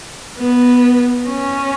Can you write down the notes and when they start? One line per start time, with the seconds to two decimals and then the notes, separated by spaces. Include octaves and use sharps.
0.39 B3
1.29 C#4